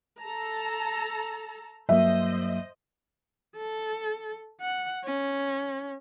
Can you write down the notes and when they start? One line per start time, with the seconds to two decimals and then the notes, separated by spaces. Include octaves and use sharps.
0.20 A4 A5 A#5
1.89 G2 F#3 A#3 C5 D#5 E5
3.57 A4
4.60 F#5
5.04 C#4